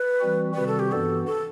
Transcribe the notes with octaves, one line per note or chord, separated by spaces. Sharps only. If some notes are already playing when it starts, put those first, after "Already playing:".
Already playing: B4
E3 G3 C4 F#4
C3 D#3 G3 C4 F#4 B4
A4
G4
G2 E3 B3 F#4 A4
A4